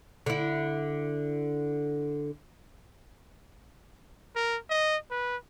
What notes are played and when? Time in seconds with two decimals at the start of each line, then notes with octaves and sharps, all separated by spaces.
0.26 D3 E4
4.36 A#4
4.70 D#5
5.10 B4